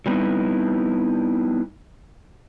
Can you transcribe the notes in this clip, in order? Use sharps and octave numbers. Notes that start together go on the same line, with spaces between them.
F#3 G3 B3 C4 D#4 E4